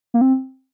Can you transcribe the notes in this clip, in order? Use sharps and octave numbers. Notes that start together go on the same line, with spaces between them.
A#3
C4